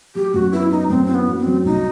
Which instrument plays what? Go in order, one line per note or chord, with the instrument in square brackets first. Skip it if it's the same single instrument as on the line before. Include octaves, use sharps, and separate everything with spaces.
[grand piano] F#3 [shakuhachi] G4
[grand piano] F#2 [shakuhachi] F#4
[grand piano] B3 [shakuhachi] E4
[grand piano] B3 [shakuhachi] D#4
[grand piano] F#2 [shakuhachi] C4
[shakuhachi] C4 [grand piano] E4
[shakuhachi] B3
[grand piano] F#3
[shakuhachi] C4
[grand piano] F#3
[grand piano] C2 [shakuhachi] D#4